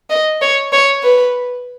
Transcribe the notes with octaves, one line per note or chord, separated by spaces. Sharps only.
D#5
C#5
C#5
B4